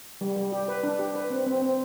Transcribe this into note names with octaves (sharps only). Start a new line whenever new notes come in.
G3
G3
G4
B4
D4
G4
B4
C4
C4
C4